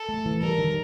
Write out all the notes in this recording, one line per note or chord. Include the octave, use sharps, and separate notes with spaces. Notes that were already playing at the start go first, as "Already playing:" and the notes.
Already playing: A4
A3
E3
G3 A#4
D#3